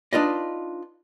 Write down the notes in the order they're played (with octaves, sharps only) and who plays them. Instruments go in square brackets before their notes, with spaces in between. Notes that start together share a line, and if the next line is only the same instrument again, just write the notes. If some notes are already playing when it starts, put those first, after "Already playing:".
[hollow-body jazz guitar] D4 D#4 F4 B4 D5 D#5